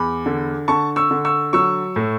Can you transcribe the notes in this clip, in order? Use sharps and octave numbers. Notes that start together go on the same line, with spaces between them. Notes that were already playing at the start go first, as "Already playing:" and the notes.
Already playing: E2 B5
D3
D3 A5 C#6
C#6 E6
D3
C#6 E6
F#3 C#6 E6
A2